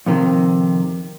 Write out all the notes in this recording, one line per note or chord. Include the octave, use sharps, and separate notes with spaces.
F2 C3 D#3